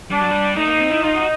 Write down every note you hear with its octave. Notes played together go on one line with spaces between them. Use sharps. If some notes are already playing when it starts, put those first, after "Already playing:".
G3 D4
F#3
G3
A3 D#4
A#3
C4
E4
D#4 F4
F#4